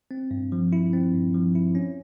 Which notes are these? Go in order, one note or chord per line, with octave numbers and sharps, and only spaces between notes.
C4
G2
F3
E4
C4
G2
F3
E4
C#4